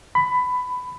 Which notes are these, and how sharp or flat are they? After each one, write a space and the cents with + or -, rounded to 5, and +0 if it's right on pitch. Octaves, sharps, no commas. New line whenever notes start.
B5 +15